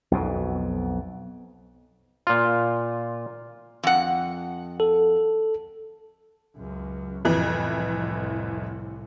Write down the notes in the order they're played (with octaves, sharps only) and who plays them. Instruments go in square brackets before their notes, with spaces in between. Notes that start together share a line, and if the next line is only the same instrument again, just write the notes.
[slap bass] B1 F2 B2
[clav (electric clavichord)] A#2 F4
[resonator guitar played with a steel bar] F2 F#5
[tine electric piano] A4
[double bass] C#2 F#2
[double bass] C2 A2 [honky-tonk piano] F2 E3